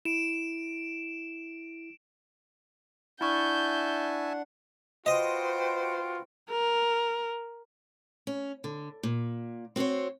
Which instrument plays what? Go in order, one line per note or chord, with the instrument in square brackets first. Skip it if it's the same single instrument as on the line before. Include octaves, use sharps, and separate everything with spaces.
[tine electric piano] E4 [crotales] D7 E7
[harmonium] D4 F#5 [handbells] E4 C#6 [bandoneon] E5 G#5 A5 [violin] G6
[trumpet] F4 [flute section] F#4 B4 G5 [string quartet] C5 [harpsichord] D#5
[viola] A#4
[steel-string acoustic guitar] C#4
D3
A#2
C4 F#4 G#4 C5 C#5